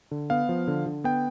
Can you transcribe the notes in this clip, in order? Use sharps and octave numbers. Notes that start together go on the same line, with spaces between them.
D3
B3 F5
F3
D3
D3
B3 G5